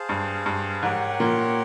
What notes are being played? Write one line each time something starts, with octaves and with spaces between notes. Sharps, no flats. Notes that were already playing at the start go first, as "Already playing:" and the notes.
Already playing: G#4 C5 F5 A5
G2
G2
G#2 G4 A#4 C#5 F#5
A#2